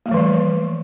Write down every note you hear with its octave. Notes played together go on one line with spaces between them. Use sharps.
E3 F3 G3 A3 A#3